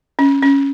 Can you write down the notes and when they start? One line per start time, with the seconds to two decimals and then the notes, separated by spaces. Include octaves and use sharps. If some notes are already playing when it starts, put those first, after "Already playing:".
0.19 C#4
0.42 C#4